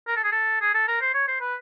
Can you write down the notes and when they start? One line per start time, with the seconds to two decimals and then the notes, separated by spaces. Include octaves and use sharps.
0.08 A#4
0.16 A4
0.24 G#4
0.32 A4
0.61 G#4
0.74 A4
0.88 A#4
1.01 C5
1.14 C#5
1.28 C5
1.41 B4